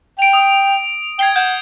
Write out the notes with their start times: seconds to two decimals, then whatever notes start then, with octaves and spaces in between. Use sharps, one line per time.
0.19 G5 D7 F7
0.33 D#6
1.19 G5 G#6 C7 G7
1.36 F#5 G6